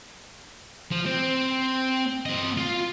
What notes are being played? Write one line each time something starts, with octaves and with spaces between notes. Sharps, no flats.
F3
C4
C4 D#5
F4